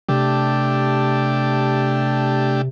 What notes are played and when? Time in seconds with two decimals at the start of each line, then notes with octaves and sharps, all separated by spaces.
0.09 C3 A3 D4 G4